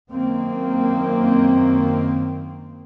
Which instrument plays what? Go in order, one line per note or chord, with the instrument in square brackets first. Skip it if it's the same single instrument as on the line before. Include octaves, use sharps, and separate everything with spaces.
[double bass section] F#2 D#3 A#3 C4